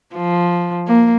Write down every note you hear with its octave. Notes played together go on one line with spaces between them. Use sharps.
F3
A#3